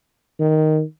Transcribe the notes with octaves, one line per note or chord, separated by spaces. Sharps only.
D#3